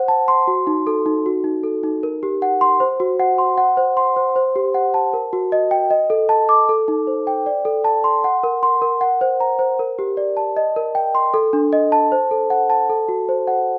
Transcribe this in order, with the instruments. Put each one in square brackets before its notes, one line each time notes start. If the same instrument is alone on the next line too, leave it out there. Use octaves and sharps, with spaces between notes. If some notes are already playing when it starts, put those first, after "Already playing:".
Already playing: [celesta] C5 F#5
A5
C6
F#4
D#4
A4
D#4
F#4
D#4
A4
D#4
A#4
G4
F#5
C6
C5
F#4
F#5
C6
F#5
C5
C6
C5
C5
G4
F#5
A5
A#4
F#4
D#5
G5
D#5
A4
A5
D6
A4
D#4
C5
G5
D5
A4
A5
C6
F#5
A#4
C6
A#4
F#5
C5
A#5
C5
A#4
G4
D5
A5
D#5
A#4
G5
C6
A4
D4
D#5
A5
C5
A4
F#5
A5
A4
F#4
C5
F#5